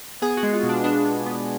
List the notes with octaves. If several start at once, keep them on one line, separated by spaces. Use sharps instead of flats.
B3 G#4
F#4
G#3
F4
B2
D4
B3 D4
B3
B3